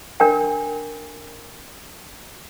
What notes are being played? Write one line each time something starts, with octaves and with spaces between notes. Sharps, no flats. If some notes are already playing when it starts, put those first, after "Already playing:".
D4 A#4 G5